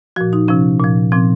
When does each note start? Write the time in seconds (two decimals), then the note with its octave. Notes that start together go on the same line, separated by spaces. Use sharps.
0.16 A#2 F3 F#4
0.33 D#4
0.48 C3 F3 C#4
0.80 A#2 F3
1.12 A#2 F3 C4